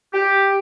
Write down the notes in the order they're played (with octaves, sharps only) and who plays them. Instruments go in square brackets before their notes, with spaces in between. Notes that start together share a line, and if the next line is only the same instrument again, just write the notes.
[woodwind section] G4